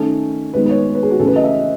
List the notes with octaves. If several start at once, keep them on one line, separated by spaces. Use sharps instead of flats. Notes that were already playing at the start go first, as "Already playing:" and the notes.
Already playing: D#3 A3 C#4 A4
D#3 G#3 B3 B4
B4
C#5
B4
G#4
F#4
C#3 E3 A3 C#4 A4
B4
D#5
E5